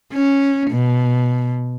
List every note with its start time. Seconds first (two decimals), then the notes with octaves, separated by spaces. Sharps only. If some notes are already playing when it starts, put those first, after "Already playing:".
0.13 C#4
0.71 B2